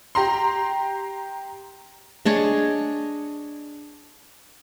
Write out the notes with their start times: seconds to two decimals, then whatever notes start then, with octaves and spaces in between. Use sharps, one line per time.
0.15 G4 A#5 C6
2.26 D4 G#4 C#5 D#5